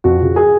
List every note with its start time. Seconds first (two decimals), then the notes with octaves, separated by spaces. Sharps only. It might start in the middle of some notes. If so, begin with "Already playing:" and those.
0.04 F2 F#4
0.20 C#3 F3
0.36 G#4